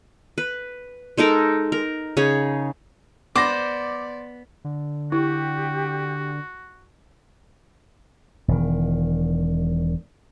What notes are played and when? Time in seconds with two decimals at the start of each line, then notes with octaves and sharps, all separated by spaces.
0.38 B4
1.18 G#3 D#4 A4 A#4
1.72 A#4
2.17 C#3 D#4 G#4 C#5
3.36 B3 C5 D5 D6 A#6
4.64 D3
5.12 E4 F#4 G4
8.48 E1 D#3